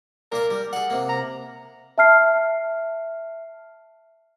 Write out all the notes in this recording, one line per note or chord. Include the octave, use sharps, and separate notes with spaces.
A#2 A#3 A#4 D5
G3
G#4 D5 F#5
C3 A#3
A#5
E5 A5 F6 C7